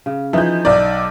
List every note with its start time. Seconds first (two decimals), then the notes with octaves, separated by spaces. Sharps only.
0.06 C#3
0.33 E3 F3 D#4 E4 G6
0.65 B1 D#4 D5